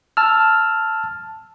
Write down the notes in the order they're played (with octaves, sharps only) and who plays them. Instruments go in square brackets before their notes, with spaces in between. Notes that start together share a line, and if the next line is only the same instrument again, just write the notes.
[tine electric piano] A5 E6 F6